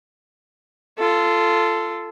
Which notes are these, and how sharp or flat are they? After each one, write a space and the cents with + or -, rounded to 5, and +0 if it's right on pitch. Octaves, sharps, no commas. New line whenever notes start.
F4 -20 A4 +0